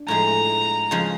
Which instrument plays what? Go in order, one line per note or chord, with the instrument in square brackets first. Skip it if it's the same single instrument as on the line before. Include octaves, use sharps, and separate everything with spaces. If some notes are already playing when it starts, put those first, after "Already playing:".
Already playing: [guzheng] D4
[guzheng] A2 F3 G#3 [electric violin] A#5
[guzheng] C#3 F3 G#3